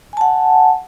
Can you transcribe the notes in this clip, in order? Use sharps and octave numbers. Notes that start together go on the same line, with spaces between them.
F#5 G#5 A5